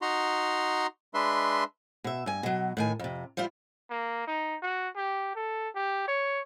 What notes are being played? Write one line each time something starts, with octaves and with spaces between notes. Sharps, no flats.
D#4 F#4 A#5 C6
G#3 D4 B4 E5 C6
B2 E5
G2 G#5
B2 F#3
A2 D#3 G#5
F2 C3
F3 G3 E4 F4
A#3
D#4
F#4
G4
A4
G4
C#5